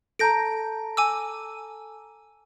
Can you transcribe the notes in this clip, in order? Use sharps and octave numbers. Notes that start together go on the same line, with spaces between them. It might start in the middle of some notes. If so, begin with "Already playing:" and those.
A4 A5 A#5 G6 A#6 D7
G#5 D6 E6